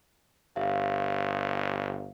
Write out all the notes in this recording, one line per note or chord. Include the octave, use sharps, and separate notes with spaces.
G1 G4 E5 F5